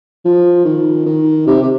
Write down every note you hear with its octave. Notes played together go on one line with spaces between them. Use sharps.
F3
D#3
D#3
C3
C3